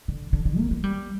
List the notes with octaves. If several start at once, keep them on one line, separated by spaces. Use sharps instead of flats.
D3
D3
D3
A#3
A#3
G3